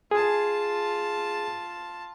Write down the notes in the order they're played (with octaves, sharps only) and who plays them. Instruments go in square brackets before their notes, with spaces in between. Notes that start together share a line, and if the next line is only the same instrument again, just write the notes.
[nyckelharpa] F4 A5 [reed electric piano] G#4